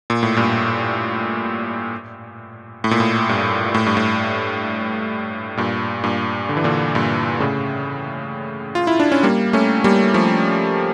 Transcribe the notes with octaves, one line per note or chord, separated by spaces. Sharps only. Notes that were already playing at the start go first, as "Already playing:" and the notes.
A#2
A2
G2 A#2
A2
A#2
A2
G2
A2
G2
A2
G2 A#2
G2 A#2
D3
E3
A#2 D3
G2 A#2
A2 C#3
F4
E4
D4
C#4
G3 A#3
A3 C#4
G3 A#3
F3 A3